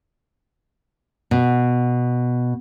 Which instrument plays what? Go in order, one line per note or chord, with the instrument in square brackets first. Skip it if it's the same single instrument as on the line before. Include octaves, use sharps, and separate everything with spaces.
[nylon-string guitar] B2